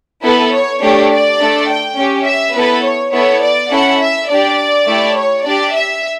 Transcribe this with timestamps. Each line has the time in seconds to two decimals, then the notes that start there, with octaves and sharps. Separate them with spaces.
0.23 B3 E4 A4 B4
0.53 C#5
0.81 A3 D4 G4 C#5
1.11 D5
1.40 A3 D4 A4
1.69 G5
1.97 C#4 G4
2.26 E5
2.55 B3 E4 A4 B4
2.83 C#5
3.13 B3 E4 A4 C#5
3.42 D5
3.71 C#4 E4 A4 F#5
3.99 E5
4.29 D4 G4 D5
4.87 A3 E4 G4
5.16 C#5
5.45 D4 G4 D5
5.74 E5